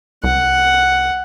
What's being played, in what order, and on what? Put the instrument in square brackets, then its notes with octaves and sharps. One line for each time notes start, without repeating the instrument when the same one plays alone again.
[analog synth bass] C2 [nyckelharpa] F#5